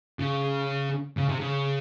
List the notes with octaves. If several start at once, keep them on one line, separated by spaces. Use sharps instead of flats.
C#3
C#3
C3
C#3